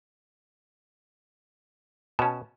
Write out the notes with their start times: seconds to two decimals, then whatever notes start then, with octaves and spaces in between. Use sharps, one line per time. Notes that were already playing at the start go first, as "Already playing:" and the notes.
2.19 B2 C#4 A5